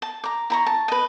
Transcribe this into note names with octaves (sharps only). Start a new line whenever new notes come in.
A5
A#5 D6
E4 A#5 C#6
A5
B4 D#5